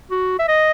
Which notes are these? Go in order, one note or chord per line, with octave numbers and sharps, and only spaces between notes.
F#4
E5
D#5